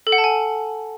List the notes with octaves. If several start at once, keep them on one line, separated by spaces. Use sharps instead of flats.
A4
F#5
A5
G#5